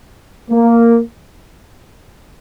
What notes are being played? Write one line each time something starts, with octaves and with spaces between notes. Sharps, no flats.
A#3